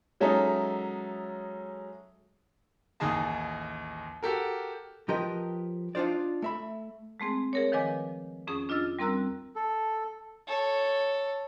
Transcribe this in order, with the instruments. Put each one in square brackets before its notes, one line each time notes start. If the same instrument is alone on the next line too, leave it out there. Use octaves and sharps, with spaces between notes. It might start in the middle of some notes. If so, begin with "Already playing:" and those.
[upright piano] F#3 G#3 C#4 D#4 A4 E5
[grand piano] A1 D#2 D#4 G#4 D#5 A5
F#4 G4 A4 A#4
[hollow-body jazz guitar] F3 G4 A#4 B4 D#5
D4 D#4 F4 C5 D5
A3 E5 B5
[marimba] G#3 A3 C4 G#4
G#4 A#4 C#5
D#3 F3 B4 D#5 G#5 D6
F2 C#4 G#4 C#6 D#6
D4 F4 D#5 E6 F6 A6
G3 C4 A#4 A#5 E6 F#6
[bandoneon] A4
[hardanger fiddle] A4 C#5